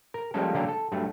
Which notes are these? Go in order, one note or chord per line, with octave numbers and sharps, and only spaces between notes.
A#4
F3 G3 G#3 A#3 C#4 A4
D3 F#3 A#3 D4 A#4 G5
A4
G2 F#3 A3